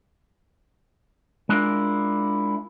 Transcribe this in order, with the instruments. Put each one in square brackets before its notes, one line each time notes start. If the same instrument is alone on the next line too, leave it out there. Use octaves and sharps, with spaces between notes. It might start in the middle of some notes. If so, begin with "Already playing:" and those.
[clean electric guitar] G#3 D4 E4 F4 A#4